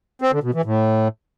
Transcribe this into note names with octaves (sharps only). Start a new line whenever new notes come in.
C4
D3
B2
E3
A2